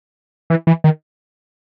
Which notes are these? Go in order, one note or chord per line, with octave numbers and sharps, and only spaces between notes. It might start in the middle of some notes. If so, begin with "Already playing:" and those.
E3
E3
D#3